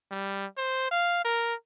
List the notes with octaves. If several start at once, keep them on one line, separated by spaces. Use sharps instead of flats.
G3
C5
F5
A#4